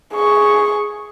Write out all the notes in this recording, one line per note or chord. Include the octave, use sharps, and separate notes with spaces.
G#4 C#6